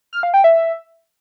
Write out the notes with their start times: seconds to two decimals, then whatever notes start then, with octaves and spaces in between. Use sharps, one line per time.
0.13 F6
0.23 F5
0.34 G5
0.44 E5